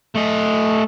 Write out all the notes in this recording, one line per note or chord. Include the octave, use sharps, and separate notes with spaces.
A3 D#5